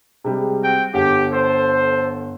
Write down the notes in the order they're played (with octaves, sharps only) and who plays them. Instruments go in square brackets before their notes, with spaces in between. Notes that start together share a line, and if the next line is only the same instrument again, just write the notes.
[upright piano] C3 G3 G#3
[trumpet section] C4 F#4 G5
[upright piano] G1 F#5 [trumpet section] G4
[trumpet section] A4 C5